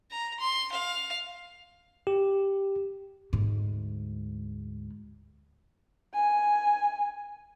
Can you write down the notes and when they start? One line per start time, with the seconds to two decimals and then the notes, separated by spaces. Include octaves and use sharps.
0.11 A#5
0.40 C6
0.72 F5
2.07 G4
3.33 D2 G#2
6.14 G#5